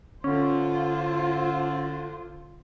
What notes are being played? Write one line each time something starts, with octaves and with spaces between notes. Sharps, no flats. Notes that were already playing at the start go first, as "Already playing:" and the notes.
D3 C#4 F4 C5